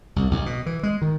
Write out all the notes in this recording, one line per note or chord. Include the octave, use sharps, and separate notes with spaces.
C2
B1
B2
E3
G#3
D#3